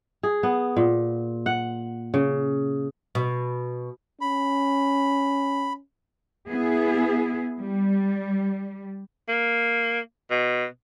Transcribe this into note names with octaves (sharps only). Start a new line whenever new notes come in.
G#4
B3
A#2
F#5
C#3
B2
C#4 B5
B3 E4 G#4
G3
A#3
B2